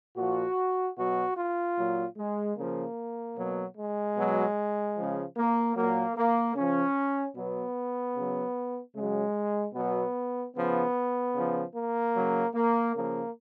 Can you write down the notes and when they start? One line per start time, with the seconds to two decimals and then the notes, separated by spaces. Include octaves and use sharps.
0.17 A#2 F3 F#4
0.96 B2 F#3 F#4
1.36 F4
1.77 A#2 F#3
2.17 G#3
2.56 C#3 F3 A#3
3.37 B2 F#3
3.76 G#3
4.16 B2 F#3
4.96 C#3 F3
5.36 A#3
5.76 A#2 F#3 A#3
6.16 A#3
6.55 C#3 F3 C#4
7.36 B2 F#3 B3
8.15 C#3 F#3
8.95 C#3 F#3 G#3
9.75 B2 F#3 B3
10.55 C#3 F3 B3
11.34 C#3 F3
11.75 A#3
12.15 C#3 F#3
12.55 A#3
12.95 C#3 F3 A#3